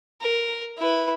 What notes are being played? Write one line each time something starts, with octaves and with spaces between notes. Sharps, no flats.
A#4
E4 B4